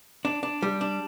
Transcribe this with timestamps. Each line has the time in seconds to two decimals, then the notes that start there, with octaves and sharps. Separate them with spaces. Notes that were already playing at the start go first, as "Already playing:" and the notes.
0.25 D4
0.43 D4
0.62 G3
0.81 D4